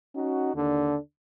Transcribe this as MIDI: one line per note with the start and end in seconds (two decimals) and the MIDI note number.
0.15 0.52 61
0.15 0.52 63
0.15 0.52 66
0.55 0.96 39
0.55 0.96 50
0.55 0.96 62